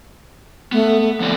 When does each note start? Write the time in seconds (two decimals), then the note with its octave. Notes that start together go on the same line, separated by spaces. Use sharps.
0.72 A3 B3
1.01 A3
1.20 F3 C4 D5